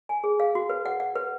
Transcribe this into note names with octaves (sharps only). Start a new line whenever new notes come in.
G#5
G#4
F5
F#4
B4
F#5
F#5
B4